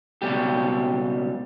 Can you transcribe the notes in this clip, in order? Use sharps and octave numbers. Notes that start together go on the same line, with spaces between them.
C#2 B2 G3 G4